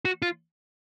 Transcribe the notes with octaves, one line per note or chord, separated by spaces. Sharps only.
F#4
F4